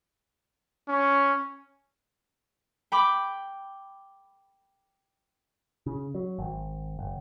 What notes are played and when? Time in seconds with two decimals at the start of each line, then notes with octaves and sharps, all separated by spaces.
0.88 C#4
2.92 G5 B5 D6
5.86 C#3
6.15 F#3
6.39 G#1
6.99 F#1